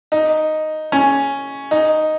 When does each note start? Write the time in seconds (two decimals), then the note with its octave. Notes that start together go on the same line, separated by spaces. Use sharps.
0.12 D#4
0.92 C#4
1.71 D#4